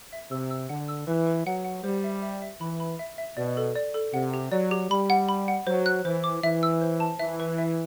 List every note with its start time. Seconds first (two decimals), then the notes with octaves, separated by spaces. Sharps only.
0.13 E5
0.31 C3 E6
0.51 E6
0.69 D3 F#5
0.88 E6
1.07 E3 B4
1.27 B4
1.46 F#3 F#5
1.65 F#5
1.84 G3 C5
2.04 E5
2.22 E5
2.42 E5
2.61 E3 B5
2.80 B5
2.99 E5
3.18 E5
3.37 B2 D5
3.57 A4
3.76 D5
3.94 A4
4.14 C3 F#5
4.34 G4
4.52 F#3 D5
4.71 G4
4.90 G3 B5
5.10 F#5
5.29 B5
5.48 F#5
5.67 F#3 C5
5.86 F#6
6.05 E3 C5
6.24 D6
6.43 E3 E5
6.63 E6
6.81 C5
7.00 A5
7.19 E3 E5
7.40 B4
7.58 E5